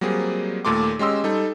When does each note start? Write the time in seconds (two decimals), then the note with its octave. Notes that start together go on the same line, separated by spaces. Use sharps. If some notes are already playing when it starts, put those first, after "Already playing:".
0.01 F#3 G3 A#3 C4 G#4
0.65 D#2 A#2 A3 C6 D6
0.99 G#3 C#4 G4 D#5 C6 E6
1.24 G3 D#4 A4